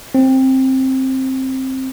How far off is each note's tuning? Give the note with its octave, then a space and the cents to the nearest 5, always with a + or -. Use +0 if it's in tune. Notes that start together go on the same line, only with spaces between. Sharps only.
C4 +10